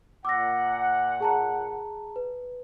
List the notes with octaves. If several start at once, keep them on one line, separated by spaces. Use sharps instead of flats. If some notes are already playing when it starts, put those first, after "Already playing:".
A#2 F#5 D6 E6 A#6
G#4 A5 A#5
B4